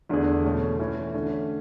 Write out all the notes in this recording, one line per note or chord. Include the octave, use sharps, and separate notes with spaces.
E2 D3 A3 D4 G#4
B2 A3 C#4
E3 A3 C#4
D3 A3 C#4